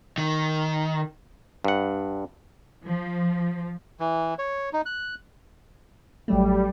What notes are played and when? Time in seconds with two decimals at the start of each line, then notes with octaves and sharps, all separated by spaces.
0.18 D#3
1.64 G2 F#5
2.87 F3
4.00 E3
4.39 C#5
4.73 D#4
4.86 F#6
6.28 A1 F#3 G3 A3